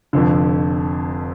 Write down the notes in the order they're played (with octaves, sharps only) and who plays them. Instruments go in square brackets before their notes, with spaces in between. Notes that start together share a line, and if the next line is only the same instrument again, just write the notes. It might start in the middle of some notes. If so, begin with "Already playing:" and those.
[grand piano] F1 F2 D3